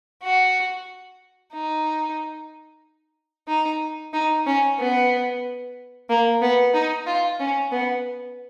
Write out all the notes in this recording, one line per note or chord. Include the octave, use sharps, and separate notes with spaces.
F#4
D#4
D#4
D#4
C#4
B3
A#3
B3
D#4
F4
C#4
B3